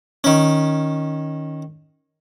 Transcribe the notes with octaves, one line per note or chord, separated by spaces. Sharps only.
D#3 C#4